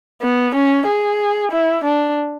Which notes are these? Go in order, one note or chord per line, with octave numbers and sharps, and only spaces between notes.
B3
C#4
G#4
E4
D4